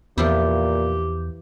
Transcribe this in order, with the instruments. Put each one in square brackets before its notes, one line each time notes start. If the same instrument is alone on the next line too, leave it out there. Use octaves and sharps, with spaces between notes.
[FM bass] E2 [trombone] A#2 [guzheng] E3 F3 E4 [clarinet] G4